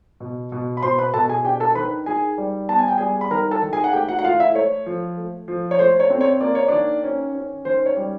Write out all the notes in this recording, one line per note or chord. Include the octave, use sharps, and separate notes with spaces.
B2
B2
B5
B2 C5 C6
B4 B5
B2 A4 A5
G#4 G#5
D4 G4 G5
A4 A5
D#3 B4 B5
D#3 G#4 G#5
G3
B3 A5
G#5
G5
G3 G#4 G#5
B5
D#3 A#4 A#5
A4 A5
D#3
G#4 G#5
F#5
A3 G4 G5
F#4 F#5
F#5
A3 F4 F5
E4 E5
A3 C#5
F3
A3
F3
C#5
A3 C5
C#5
C4
C#5
A#3 D5
C#5
D#3 D4 D5
C#4
C#4
D#3 C5
C#5
G3